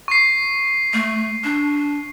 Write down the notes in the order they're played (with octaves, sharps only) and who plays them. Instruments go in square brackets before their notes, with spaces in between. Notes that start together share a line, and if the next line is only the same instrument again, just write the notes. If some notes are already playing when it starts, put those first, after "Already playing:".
[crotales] C#6 C7
[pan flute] A3
D4